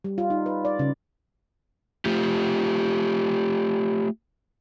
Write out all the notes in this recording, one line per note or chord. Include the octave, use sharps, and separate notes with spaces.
G3
F4
D#4
B4
D5
C#3
A3 F4 G4